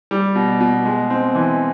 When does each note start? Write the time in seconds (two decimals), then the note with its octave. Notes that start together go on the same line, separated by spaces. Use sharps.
0.11 G3
0.35 B2
0.60 B2
0.85 G#3
1.10 C4
1.35 E3